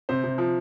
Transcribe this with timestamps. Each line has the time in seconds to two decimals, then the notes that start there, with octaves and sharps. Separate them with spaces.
0.09 C3 C5
0.24 C3
0.38 F3